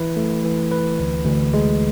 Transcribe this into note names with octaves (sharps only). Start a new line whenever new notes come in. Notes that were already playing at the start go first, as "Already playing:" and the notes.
Already playing: E3 E4 B4
A3
E3
B4
D2
D2
G#3